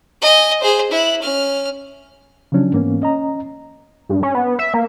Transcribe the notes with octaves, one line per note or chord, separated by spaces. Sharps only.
D#5 G#5
G#4 C5
E4 F#6
C#4 F6
C#3 F3 F#3 C#4 D4
G#2 E3 A#3 B3 C#4
C#4 D#5 A#5
G2
C#4
B3
E5
A#3